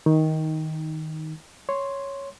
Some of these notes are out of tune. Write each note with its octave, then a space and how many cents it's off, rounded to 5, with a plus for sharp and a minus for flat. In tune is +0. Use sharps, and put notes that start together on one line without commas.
D#3 +15 D#4 +0
C#5 +0 C6 +0